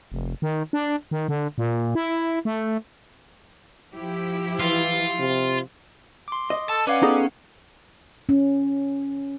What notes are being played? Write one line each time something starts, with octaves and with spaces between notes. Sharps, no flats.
F1
D#3
D4
D#3
D3
A#2
E4
A3
F3 E4 G4
E3 F4
C3
C6 D6
D#5
A4 A5
C#4 B4 D5 F5 F#5
B3 D#4 G#4 A4
C#4